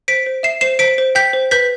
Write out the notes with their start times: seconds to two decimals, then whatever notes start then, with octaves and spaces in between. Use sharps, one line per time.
0.08 C5 B6 D7
0.26 C5
0.43 E5 C7 E7
0.61 C5 C7 E7
0.79 C5 B6 D7
0.98 C5
1.15 G5 G6 B6
1.33 C5
1.51 B4 G6 B6